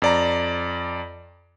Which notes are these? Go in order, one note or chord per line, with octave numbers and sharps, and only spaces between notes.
F2 D5 A#5